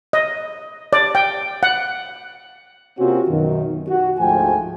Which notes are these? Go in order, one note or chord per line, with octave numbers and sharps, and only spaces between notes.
D#5
D5
G5
F#5
C3 A#3 C4 C#4 F4 F#4
F#2 B2 D#3
F#4
D2 G#2 F3 A3 G5 G#5